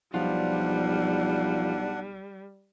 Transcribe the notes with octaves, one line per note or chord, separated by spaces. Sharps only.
B1 F3 G3 D4 F4 F#5